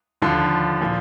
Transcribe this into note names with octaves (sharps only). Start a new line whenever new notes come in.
D#2 D3 F3 C6
A#2 F3